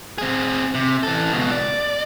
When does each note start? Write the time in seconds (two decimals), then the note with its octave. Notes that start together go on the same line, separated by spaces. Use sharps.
0.18 C4 G#4
0.75 C3
1.03 E3 A4
1.32 C#2 B2
1.51 D5